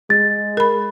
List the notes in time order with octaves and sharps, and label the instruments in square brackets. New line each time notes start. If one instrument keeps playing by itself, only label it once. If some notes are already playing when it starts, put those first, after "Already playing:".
[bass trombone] G#3 [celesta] A6
[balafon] A#4 B5